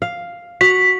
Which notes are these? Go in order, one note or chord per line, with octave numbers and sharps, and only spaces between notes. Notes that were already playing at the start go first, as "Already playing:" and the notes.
F5
F#4 B6